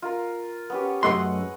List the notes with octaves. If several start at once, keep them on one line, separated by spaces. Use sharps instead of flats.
F4 A#4
B3 C#4 G4
F#2 G#3 A3 D#5 F#5 C6